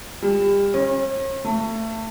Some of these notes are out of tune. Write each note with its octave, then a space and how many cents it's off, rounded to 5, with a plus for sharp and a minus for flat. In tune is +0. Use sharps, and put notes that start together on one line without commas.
G3 +30
C#4 -45
A3 +25